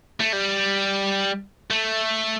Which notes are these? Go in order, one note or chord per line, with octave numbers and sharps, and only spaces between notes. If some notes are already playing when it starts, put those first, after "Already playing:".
A3
G3
A3